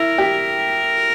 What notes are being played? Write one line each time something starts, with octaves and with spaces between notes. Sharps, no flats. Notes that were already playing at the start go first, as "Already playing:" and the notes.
Already playing: E4 A#4
G4